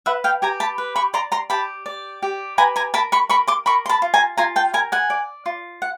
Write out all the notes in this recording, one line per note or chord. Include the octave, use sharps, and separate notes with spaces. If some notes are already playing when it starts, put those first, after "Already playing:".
B4 E5 F#5
F5 G5
G4 G#5 A#5
A5 B5
B4
B5 C#6
D5 A#5 C6
A#5 C6
G4 A5 B5
D5
G4
B4 G#5 A#5
G#5 A#5
A#4 A5 B5
B5 C#6
A#4 B5 C#6
C6 D6
A#4 B5 C#6
C6
A5 B5
F4
G#5 A#5
F4 G#5 A#5
G5 A5
A#4 G#5 A#5
F#5 G#5
D5
F4
F#5